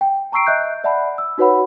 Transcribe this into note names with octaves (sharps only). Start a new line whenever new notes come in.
G5
A5 A#5 C#6 E6 C7 D7
D#5 E5 F#6 G6
D5 E5 F#5 A5 B5
E6
D#4 F#4 B4 C#5 F#5 B5